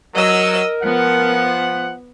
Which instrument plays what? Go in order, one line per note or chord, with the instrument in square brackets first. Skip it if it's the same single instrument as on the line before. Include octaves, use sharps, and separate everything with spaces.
[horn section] F#3 [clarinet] A#4 [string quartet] D#5 E6
[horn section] F3 F#5 [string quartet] B3